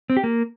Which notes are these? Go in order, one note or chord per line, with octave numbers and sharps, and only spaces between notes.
C4
G4
A#3